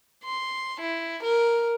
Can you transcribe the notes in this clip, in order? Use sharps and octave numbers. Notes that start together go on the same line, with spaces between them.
C6
E4
A#4